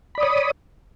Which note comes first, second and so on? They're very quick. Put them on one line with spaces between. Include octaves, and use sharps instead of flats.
B5 D5 D#6 C#5